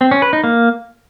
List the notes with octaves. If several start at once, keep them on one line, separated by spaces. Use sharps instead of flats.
C4
C#4
B4
D#4
A#3